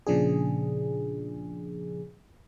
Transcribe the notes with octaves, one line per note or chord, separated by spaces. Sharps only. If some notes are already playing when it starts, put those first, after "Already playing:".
A#2 C#3 F3 D4 G#4